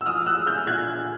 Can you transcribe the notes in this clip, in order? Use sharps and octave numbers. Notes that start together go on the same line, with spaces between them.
E6
F3 D#6 F6
E6 F#6
G#3
F6 G6
A#2 F#6 G#6